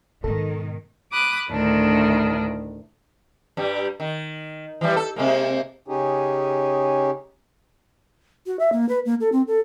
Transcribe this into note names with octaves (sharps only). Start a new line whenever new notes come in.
G#2 B2 D#3 A4
B5 D6 D#6 F#6
D2 A2 D#3 D4
G2 G3
D#3
E3 G3
A4
C3 G#3 A#3
C#3 C#4 D#4 G4 G#4
F#4
E5
A#3
B4
A#3
A4
C4
A4